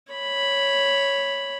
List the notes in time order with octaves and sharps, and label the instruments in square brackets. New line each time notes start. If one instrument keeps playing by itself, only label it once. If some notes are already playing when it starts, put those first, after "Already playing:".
[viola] C#5 B5